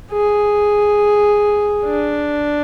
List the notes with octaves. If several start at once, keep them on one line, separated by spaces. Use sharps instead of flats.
G#4
D4